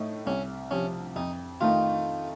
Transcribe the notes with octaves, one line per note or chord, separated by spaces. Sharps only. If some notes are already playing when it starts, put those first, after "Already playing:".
Already playing: A2 A3 D#4
C2 C#4
C3 F3 C#4
F2 D#4
D#3 A3 D#4 F4